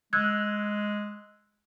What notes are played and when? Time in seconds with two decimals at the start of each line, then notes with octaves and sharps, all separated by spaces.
0.13 G#3 E6 F#6 G#6